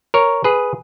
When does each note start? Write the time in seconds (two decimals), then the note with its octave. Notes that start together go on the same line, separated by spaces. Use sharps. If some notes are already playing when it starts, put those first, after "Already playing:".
0.14 A#4 C#5
0.44 G#4 B4